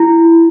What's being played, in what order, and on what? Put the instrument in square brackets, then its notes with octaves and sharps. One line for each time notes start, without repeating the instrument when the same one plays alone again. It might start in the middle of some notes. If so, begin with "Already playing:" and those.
Already playing: [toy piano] E4